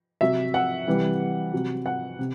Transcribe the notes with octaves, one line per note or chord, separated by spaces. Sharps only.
C3 F#3 E5
F#5
C3 E3 G3
C3 F#3
F#5
C3